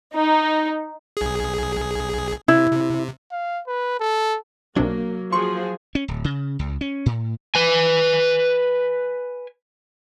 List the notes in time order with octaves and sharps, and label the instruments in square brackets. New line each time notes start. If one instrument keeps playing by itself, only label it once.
[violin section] D#4
[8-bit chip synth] B1 G#4
[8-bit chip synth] C3 [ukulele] E4
[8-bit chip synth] C3
[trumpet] F5
B4
A4
[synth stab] B1 C3 D4 [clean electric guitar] F#3 [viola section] A#3
[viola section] F3 F#4 G#4 [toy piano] C6 [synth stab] C#6
[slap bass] C#4
D1
C#3
C#2
C#4
A2
[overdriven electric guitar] B4 G#5